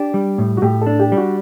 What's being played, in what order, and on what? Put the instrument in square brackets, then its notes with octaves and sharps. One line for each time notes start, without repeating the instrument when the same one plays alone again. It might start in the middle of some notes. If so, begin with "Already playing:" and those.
Already playing: [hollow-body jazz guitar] D4 [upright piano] G4
[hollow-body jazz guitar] G3
A2
[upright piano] F#4
[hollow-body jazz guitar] A2 [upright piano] G4
[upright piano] A4
[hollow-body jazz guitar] D4
[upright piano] G4
[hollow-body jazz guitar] G3
[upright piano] F#4